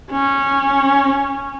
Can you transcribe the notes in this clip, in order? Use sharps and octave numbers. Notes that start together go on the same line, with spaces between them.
C#4